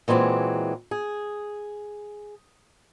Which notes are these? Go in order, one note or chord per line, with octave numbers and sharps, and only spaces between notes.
A#2 E3 G#3 C4 C#4 F#4
G#4